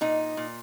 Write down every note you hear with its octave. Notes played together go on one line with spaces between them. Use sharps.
A#2 D#4
A#2